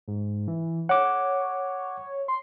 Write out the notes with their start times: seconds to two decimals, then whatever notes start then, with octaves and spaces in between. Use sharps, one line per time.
0.08 G#2
0.48 E3
0.89 C#5 F#5 D6
2.28 C6